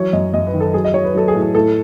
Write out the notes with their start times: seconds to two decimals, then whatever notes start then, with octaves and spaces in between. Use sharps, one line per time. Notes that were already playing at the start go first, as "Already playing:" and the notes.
Already playing: E3 F#3 C#5
0.13 F#2 D#5
0.34 F#2 D#5
0.47 B4
0.54 D#3
0.60 A4
0.74 F#3 G#4
0.84 D#5
0.94 F#3 C#5
1.04 B4
1.15 F#3 A4
1.28 G#4
1.35 A2
1.42 G#4
1.55 A2 A4